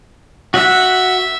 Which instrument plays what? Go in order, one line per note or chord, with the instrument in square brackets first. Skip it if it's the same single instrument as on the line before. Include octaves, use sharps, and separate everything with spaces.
[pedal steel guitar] F#4 F#5 [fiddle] E5